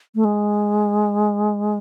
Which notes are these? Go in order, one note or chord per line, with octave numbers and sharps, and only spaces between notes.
A3
G#3